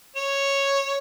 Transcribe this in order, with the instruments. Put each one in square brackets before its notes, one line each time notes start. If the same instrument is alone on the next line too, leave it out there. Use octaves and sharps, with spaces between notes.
[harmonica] C#5